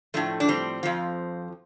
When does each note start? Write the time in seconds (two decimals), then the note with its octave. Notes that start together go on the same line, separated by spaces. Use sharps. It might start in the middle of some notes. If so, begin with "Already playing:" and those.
0.14 A2 F3 A3 D4
0.40 D4
0.48 G3 C4
0.83 F2 F3